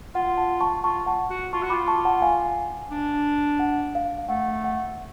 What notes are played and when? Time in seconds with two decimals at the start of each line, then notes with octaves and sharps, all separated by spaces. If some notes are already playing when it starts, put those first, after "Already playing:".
0.15 F4 F#5
0.37 F#5 A5
0.61 A5 C#6
0.84 F4 A5 C#6
1.06 F#5 A5
1.30 F#4
1.52 F4 A5 C#6
1.63 F#4
1.69 F4 B5 D6
1.88 A5 C#6
2.05 F#5 A5
2.22 F5 G#5
2.91 D4
3.59 F#5
3.95 F5
4.29 A3 F#5
4.64 F#5